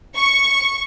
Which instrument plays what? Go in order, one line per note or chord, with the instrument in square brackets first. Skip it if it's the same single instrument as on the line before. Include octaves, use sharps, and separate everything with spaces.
[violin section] C#6